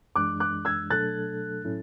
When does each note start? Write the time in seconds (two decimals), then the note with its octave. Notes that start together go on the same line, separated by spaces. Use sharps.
0.16 F#2 E3 G#3 D4 D6 F#6
0.40 D6 F#6
0.65 E6 G#6
0.90 B2 F#3 A3 D4 A4 F#6 A6
1.65 A2 F#3 C#4 E4 A4